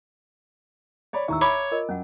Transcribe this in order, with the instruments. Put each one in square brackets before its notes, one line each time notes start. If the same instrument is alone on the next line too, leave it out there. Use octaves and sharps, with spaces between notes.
[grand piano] C#5 D5 B5
[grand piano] D#2 A2 C#6 [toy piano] E5 A#5 E6
[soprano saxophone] C#5 [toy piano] E5 [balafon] B5 [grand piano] D6
[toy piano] F4 A#4 D#5
[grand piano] F#2 [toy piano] C#4 F#5